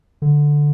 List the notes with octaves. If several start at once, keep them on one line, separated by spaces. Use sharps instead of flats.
D3